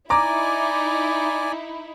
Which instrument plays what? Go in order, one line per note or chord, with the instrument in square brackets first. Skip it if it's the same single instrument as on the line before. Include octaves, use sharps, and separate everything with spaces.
[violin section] D#4 E4 [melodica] D5 G#5 [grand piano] A#5 D6